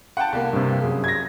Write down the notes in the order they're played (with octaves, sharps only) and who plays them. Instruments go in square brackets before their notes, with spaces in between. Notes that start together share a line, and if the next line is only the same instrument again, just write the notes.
[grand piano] F#5 G5 A5
C2 A#3
[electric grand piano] G2 C3
F#2 G#4
[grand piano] G#6 A#6